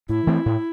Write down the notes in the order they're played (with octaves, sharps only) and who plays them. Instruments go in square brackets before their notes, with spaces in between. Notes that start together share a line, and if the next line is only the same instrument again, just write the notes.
[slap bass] A2 [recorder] E4
[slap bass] E3 A3 C4
A2